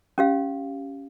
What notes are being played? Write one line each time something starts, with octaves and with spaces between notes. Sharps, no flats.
C#4 G4 F5